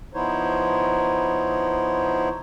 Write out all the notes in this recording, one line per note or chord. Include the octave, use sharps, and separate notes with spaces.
F3 B3 D#4 E4 C5 C#5